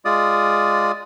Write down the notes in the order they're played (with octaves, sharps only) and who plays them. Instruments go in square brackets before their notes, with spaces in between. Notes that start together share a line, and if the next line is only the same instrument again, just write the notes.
[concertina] G#3 F4 D5 D#6